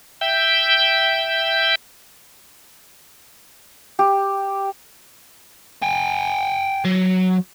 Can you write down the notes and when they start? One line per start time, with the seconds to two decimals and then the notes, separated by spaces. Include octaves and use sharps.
0.21 E5 G5 G6
3.99 G4
5.83 G5 G#5
6.85 F#3